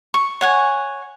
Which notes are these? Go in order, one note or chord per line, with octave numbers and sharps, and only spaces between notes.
C#6
C#5 F#5 G#5